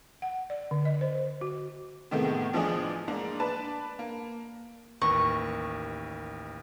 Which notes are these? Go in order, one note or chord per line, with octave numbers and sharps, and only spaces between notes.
F#5
D5
D3
D#5
C5
F#4
A2 C3 D#3 G#3 A3 B3
A1 F3 G#3 D4 D#5 G#5
G#2 A#3 D4
D4 B4 A5
A#3
A1 D#2 A#4 B4 C#6